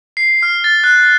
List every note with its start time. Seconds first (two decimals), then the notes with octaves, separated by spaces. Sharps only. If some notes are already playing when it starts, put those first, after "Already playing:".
0.17 C7
0.43 F6
0.64 A6
0.84 F#6